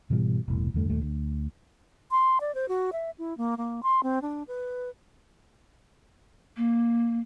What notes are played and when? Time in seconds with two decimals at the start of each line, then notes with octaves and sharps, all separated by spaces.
0.10 G#2 B2 E3 G3
0.48 E1 C2 A2
0.74 E2 G2 D3 A3
0.90 D#1 D#2 A3
1.02 D2
2.11 C6
2.40 D5
2.55 C5
2.68 F#4
2.92 E5
3.18 E4
3.37 A#3
3.57 A#3
3.83 C6
4.03 C4
4.22 D4
4.48 B4
6.57 A#3